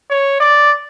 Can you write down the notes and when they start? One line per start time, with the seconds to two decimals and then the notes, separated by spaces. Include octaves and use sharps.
0.10 C#5
0.40 D5